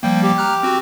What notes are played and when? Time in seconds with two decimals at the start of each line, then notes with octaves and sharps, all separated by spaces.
0.03 F3 G3 A#3 G5
0.23 G4
0.38 A#5 F6 F#6
0.63 C4 F#4